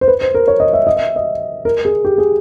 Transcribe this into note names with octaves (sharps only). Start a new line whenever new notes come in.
C5
B4
C5
A#4
C#5
D#5
E5
D#5
E5
D#5
A#4
G#4
G4
G#4